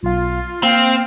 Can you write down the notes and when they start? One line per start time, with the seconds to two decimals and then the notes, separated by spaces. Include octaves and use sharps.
0.03 B1 F4 F5
0.63 A#3 C4 F5 G5